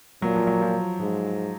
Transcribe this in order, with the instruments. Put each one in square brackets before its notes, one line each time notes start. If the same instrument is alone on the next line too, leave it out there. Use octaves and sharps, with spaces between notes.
[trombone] A#2 [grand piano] F#3
[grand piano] F3
F#3
F3
[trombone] G#2 [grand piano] F3